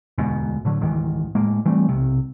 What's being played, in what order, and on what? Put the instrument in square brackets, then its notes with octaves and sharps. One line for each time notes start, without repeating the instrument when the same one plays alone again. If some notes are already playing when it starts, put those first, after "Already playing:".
[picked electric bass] E1 D2 G#2 B2
A2 D3 F#3
C#2 G#2 D#3 E3
A2 G#3 A#3
E3 G3 A3 C4
B1 C3